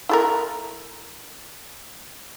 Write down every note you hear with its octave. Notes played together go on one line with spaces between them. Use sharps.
E4 A4 A#4